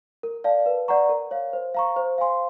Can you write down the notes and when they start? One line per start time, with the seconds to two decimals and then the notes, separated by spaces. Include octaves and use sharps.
0.23 A#4
0.44 D5 F5 A5
0.66 B4
0.88 D5 F#5 A#5 C#6
1.09 A#4
1.31 C#5 F5
1.53 C5
1.75 F5 A#5 C#6
1.96 C5
2.18 F5 G#5 C6